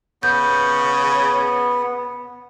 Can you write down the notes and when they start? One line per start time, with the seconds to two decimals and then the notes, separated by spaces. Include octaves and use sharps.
0.23 C#3 B3 G6